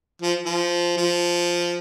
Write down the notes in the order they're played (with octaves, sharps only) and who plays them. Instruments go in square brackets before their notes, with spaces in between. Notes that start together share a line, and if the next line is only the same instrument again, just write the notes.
[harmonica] F3
F3
F3